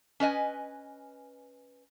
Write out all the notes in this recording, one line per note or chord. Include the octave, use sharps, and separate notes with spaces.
C#4 B4 D#5 G#5